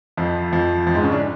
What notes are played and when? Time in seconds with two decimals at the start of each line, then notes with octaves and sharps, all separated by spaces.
0.17 F2 F3
0.52 F2 F3
0.86 F2 F3
0.95 G#2 G#3
1.03 C#3 C#4
1.12 D3 D4